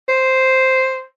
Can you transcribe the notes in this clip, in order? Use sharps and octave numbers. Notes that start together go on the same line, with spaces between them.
C5